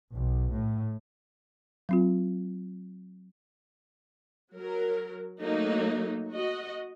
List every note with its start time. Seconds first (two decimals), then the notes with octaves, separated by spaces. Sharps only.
0.13 B1
0.50 A2
1.89 F#3 C4 F4
4.55 F#3 A#4
5.40 F#3 A3 A#3 D#4
6.31 F#4 D#5